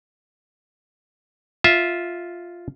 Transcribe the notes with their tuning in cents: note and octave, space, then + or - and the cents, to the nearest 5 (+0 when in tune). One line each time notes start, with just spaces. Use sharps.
F4 +0 E5 -10